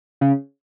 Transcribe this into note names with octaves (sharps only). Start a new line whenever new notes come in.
C#3